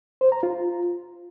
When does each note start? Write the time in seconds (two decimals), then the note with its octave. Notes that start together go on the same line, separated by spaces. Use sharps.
0.21 C5
0.32 A#5
0.43 F4